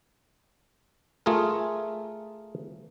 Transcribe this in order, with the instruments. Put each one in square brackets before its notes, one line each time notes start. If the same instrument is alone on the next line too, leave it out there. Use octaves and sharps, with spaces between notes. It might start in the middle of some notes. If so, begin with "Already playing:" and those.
[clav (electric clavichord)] A3 F4 G#4 A#4